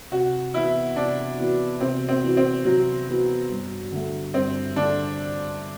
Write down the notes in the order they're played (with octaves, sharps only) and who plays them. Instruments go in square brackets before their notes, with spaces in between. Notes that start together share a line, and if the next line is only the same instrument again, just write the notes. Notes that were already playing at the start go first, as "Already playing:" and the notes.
[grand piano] C3 [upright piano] F#4
[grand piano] E3 B3 F#4 [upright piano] E4
[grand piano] C3 [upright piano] D4
[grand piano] E3 B3 F#4
[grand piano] C3 [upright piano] C4
[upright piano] C4
[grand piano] E3 B3 F#4
[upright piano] C4
[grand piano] C3 [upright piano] F#3
[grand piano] E3 B3 F#4
G2
D3 A3
[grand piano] G2 [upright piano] C4
[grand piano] D3 A3 [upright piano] D4